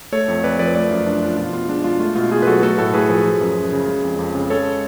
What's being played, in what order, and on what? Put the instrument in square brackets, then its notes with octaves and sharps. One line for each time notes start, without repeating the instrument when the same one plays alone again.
[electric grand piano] A3 A4 C#5
F2
F2 B4 D5
F3 B4 D5
A3 B4 D5
F#2 F4
F#2 D4
F3 F4
B2 F4
B2 F4
G#3 D4
G#3 F4
A3 F4
B2 F4
B2 F4 G#4
B4
F#3 F#4 A4
A3 F#4 A4
A2 F#4 A4
A2 G#4 B4
F3 G#4 B4
F3
F#2
F#2
C#3
G#3
F2
F2
C#3
G#3 A4 C#5